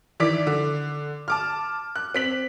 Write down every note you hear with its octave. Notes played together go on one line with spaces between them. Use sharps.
D#3 E3 D5 D6 B6
D3
A5 D6 F6
F#6
C4 B6 F#7